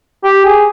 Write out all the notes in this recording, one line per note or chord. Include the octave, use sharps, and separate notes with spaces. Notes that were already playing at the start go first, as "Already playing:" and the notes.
G4
G#4